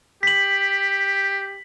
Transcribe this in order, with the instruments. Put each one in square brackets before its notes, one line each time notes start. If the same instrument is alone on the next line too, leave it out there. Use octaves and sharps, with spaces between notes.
[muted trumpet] G4 [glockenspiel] B6 F#7